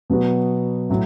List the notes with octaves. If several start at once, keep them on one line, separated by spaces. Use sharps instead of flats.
B2 F#3 B3 F#4
A2 F#3